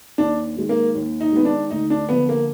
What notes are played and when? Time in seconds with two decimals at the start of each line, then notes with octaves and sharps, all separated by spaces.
0.18 D#2 D4
0.56 D#3 G#3
0.69 A#3
0.95 D#2
1.21 D#4
1.32 D#3 G#3 B3
1.45 D4
1.71 D2 D#4
1.90 D4
2.09 D3 F3 B3
2.29 A#3